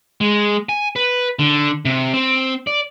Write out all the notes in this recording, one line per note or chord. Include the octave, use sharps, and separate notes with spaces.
G#3
G#5
B4
D3
C3
C4
D5